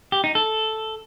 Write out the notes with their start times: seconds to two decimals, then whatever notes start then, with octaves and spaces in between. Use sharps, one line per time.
0.12 G4
0.24 D#4
0.35 A4